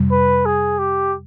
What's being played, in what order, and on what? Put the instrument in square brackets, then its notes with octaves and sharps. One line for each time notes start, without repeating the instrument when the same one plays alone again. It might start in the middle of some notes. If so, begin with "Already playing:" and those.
Already playing: [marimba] F2 C3 G3
[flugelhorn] B4
G#4
G4